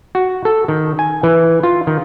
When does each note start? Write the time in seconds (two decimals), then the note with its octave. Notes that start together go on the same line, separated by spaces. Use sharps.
0.15 F#4
0.45 A4
0.68 D#3
0.99 G#5
1.23 E3
1.63 F4
1.87 D#3